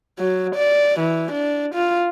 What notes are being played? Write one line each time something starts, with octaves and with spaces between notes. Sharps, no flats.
F#3
D5
E3
D4
F4